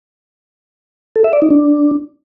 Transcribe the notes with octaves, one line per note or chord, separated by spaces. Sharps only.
A4
E5
D5
D#4
D4